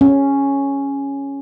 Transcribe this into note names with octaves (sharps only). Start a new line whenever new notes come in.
C#4